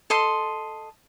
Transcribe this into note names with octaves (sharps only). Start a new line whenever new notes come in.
A4 D#5 C6